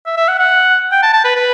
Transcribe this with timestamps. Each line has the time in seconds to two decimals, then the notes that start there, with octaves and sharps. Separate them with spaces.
0.06 E5
0.17 E5
0.28 F#5
0.39 F#5
0.92 G5
1.03 A5
1.13 A5
1.24 B4
1.35 B4